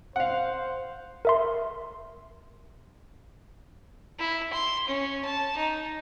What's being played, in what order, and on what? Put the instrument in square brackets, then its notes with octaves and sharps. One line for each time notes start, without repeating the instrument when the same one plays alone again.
[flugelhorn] C5 [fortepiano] F5 F#5
[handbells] A#4 E5 C6
[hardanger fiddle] E4
C6
C#4
A5
D#4